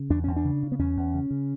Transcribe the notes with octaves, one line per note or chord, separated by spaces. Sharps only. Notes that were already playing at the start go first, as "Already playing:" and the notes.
Already playing: C#3
E2 D4
E2 C#4
D4
C#3
C#3
B3
E2 C#4
E2
C#3
C#3